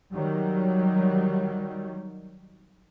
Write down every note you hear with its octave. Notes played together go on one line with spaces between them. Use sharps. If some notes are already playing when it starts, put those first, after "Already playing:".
D#3 F#3 G3